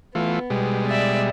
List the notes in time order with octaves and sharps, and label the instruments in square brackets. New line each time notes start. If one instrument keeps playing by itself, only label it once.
[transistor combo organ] E3 A3 F4 [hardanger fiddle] B3
[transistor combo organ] B2 G3 G#3
[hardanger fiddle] D5 E5